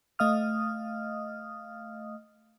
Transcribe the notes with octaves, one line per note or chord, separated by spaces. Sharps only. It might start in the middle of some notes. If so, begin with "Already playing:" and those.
A3 D#5 F5 D#6 F6